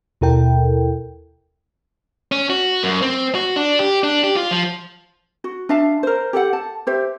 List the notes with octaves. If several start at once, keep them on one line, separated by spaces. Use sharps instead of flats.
D#2 B2 E4 A4 A#4 G5
C#4
F#4
F#2
C4
F#4
D4
G4
D4
G4
F4
F3
F#4
D4 E5 F5 A5
A#4 C5
G4 A4 C5 F#5
A5
G4 C5 E5